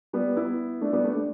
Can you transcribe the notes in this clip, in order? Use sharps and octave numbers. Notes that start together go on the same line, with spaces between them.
G3 B3
B3 E4
A3 D4
G3 B3
A3 D4
A3 D4